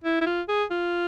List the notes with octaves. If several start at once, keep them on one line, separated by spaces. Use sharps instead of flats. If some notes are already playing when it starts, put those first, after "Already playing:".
E4
E4
F4
G#4
F4